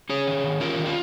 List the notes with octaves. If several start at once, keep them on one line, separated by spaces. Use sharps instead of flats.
C#4 G#4 C#5
D#3
D#3
C#4 F4 A#4
D#3
F4